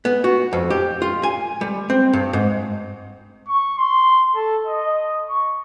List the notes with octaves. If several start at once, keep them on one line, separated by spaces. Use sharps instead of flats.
B3
F#4
F2
G4
F4
G#5
G3
C4
G2
G#2
C#6
C6
A4
D#5
C#6